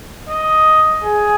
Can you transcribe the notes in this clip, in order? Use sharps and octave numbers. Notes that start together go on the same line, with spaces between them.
D#5
G#4